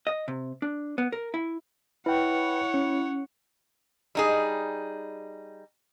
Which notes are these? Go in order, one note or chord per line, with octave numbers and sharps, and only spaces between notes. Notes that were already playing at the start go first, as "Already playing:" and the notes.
D#5
C3
D4
B3
A#4
E4
E4 B4 C#5 F#5 G5
C#4
G3 D#4 G#4